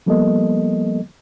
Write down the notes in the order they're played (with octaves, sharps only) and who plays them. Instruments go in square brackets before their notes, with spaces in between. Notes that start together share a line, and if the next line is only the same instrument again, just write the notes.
[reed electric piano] F3 G3 A#3 B3 A4 D#5